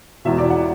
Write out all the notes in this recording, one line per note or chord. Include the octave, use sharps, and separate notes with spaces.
E1 E2 B2 E5
D5
F#5